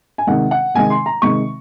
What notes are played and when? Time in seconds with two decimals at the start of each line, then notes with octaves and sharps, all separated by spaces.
0.18 G#5
0.27 C3 D#3 G#3 F#5
0.51 F#5
0.74 C3 D#3 G#3 G#5
0.90 C6
1.06 A#5
1.22 C3 D#3 G#3 C#6